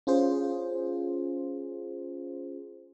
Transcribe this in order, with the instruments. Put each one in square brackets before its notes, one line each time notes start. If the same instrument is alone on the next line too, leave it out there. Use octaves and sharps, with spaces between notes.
[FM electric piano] C#4 F4 G#4 C5